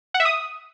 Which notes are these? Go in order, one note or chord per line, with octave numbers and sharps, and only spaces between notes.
F#5
E5
D#6